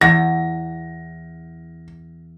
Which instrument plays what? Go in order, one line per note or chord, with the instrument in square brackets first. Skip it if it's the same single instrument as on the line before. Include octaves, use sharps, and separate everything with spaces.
[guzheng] E2 [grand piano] A#6